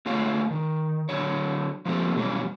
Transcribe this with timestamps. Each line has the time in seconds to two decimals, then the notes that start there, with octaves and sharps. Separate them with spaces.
0.06 D3 A3 F4 G#4 C#5 F5
0.50 D#3
1.09 D3 F#3 C#5
1.85 F3 F#3 A#3 C4 G4 A4
2.15 B2 D3 E3 F#3 G3 C#4